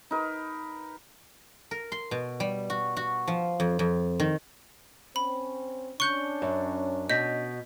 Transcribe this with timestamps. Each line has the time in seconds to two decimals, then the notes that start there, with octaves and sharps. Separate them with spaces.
0.11 D#4 A#4 B4
1.71 A#4
1.92 C6
2.11 B2
2.40 G3
2.70 F#4
2.97 F#4
3.28 F3
3.60 F2
3.79 F2
4.20 D#3
5.16 C4 C#4 B5
6.00 C#4 D4 C#6 F#6 G6 C#7 G7
6.42 F#2
7.09 B2 D#5 G6 B6